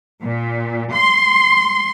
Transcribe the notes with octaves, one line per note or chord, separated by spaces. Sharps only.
A#2
C6